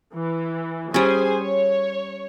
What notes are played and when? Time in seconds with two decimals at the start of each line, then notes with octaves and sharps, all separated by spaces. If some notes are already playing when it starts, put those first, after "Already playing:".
0.15 E3
0.94 G3 C#4 G#4 C5 G#5
1.41 C#5